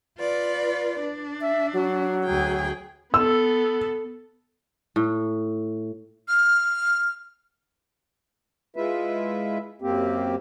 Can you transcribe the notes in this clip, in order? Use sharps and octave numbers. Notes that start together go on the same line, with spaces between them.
F4 B4 D5
D4
E5
F#3
D2 G#4 G5
B3 A4 E6
A2
F6
G#3 E4 F4 B4 E5
F#2 A#3 C4 G4